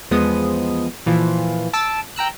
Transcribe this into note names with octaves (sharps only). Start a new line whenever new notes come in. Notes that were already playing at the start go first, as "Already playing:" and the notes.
E2 F3 G#3 B3 D#6
A#2 E3 F3 F4
A5 D6 E6
G5 A#5 E6 F#6